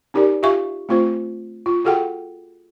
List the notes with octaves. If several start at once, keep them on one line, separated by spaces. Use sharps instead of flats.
C#4 D#4 G4 A#4 D5
F4 G4 E5 F5 G#5 C#6
A3 C4 F4 C5
F4
F4 F#4 G#4 A4 F#5 G5